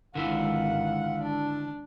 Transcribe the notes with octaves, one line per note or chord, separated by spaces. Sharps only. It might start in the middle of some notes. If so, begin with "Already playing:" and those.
G#1 D3 E4 F4 F5 F#5
D4 A5